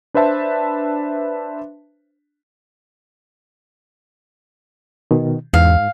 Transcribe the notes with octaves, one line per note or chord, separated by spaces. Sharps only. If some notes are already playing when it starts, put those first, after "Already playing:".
D4 B4 C5 E5 A5
B2 D#3
E2 G#2 F5